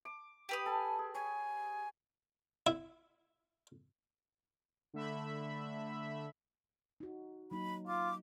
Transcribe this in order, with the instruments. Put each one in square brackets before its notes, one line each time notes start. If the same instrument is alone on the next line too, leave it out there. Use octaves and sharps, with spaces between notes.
[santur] D6
[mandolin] G4 B4 D#6
[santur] A4 A5 [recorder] G#5
[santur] G#4
[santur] C#5 [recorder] G#5
[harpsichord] E4
[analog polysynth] D3 A3 E5 B5
[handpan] D#4 F#4
[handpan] F#3 A#3 D#4 [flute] B5
[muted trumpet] F4 [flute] D6